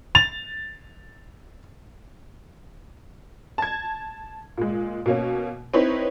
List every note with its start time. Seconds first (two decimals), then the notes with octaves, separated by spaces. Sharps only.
0.15 A6 F7
3.58 A5 G#6
4.58 A#2 G#3
5.06 B2 A#3 C#4
5.74 C4 D#4 E4 B4 C#5